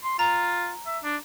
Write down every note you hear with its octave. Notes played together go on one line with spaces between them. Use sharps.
C6
F4 A#5
E5
D4